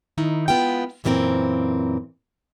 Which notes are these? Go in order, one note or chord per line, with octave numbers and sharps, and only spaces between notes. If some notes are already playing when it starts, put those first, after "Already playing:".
D#3 D#4 E4
G#3 B3 E4 F4 G5
F#2 A#2 E3 G#3 C4 A#4